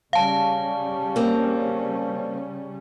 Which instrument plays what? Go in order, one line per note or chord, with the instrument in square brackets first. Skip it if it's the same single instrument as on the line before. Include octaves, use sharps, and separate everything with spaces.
[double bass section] C#3 G3 C#4 [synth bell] F5 A5
[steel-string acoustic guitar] A#3 C4